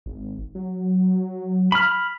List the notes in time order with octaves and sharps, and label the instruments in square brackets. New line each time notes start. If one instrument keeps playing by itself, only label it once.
[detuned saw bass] G#1
F#3
[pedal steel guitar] B5 F6